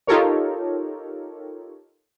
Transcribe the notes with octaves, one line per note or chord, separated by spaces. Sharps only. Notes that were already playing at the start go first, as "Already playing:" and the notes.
D#4 F4 G4 A4 A#4 C#5